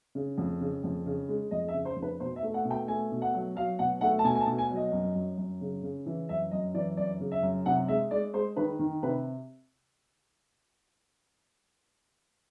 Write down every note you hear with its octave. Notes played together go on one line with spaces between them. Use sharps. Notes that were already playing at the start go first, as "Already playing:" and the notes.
C#3
F2
C#3
F2
C#3
G#3
F2 D#5
E5
C#3
C5
F2
B4
B2 C5
E5
A3
F#5
B2
G5
A3 G#5
B2
F#5
F#3
F#3 F5
B2 F#5
A3 F#5
A5
B2 G#5
G#5
A5
B2
G#5
F#3
D#5
F#2
F#2
F#2
C#3
C#3
E3
F#2 E5
F#2 D#5
E3 D5
F#2 D5
C#3
E5
F#2
C3 F#5
G#3 E5
G#3 D5
G#3 C5
D#3 B4
D#3
C3 B4